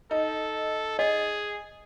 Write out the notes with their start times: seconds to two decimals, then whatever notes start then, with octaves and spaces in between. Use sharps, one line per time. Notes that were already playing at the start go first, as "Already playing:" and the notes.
0.11 D#4 A4
0.99 G#4 D#5